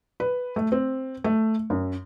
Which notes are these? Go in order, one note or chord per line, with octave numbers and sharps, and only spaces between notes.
B4
A3
C4
A3
F#2